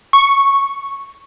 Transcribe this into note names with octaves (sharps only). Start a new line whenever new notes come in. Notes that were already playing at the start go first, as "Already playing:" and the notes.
C#6